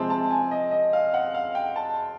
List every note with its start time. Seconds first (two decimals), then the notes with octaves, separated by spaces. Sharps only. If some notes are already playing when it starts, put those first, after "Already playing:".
Already playing: C3 F3 G#3 C4 A5
0.10 A5
0.31 G#5
0.51 D#5
0.71 D#5
0.93 F5
1.14 F#5
1.34 F5
1.55 G5
1.76 A5